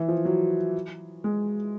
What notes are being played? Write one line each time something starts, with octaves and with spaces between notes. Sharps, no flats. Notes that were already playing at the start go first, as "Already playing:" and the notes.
Already playing: E3
F3
F#3
G#3